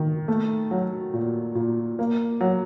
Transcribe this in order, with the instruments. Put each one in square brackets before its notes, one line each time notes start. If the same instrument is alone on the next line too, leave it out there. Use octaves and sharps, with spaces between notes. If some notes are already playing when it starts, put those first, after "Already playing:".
Already playing: [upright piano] D#3
A3
F#3
A#2
A#2
A#3
F#3